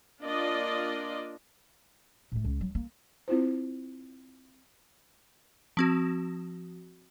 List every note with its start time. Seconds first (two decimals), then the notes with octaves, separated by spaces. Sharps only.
0.22 A#3 D4 F4 D5 D#5
2.32 A2 A3
2.44 C#2
2.61 F#3
2.75 A#3
3.28 C4 E4 F4 C5
5.77 F3 C4 F#4